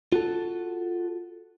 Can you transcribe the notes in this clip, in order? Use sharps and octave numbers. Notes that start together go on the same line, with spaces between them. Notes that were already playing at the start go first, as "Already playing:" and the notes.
F4 F#4 A4